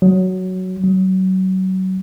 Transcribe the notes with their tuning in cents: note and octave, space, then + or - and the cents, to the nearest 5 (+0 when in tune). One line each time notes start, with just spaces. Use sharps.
F#3 +5
F#3 +25